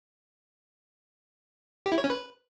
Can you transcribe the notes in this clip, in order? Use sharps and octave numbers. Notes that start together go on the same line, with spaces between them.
G4
E4
C#5
C#4
B4